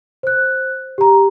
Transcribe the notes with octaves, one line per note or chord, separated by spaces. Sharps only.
C5 F#6
G4 A#5